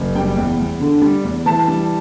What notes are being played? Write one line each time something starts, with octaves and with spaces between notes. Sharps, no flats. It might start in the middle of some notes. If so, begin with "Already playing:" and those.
Already playing: F#1
G3 G5
E2
E2
D3
G3
E2
E3 A5
G3